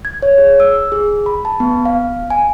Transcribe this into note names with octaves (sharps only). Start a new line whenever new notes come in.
G#6
C#5
G#4
E6
G#4
B5
A5
B3
F5
G#5